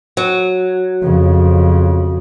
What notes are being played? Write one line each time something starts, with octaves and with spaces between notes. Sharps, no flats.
F#3
F2 C#3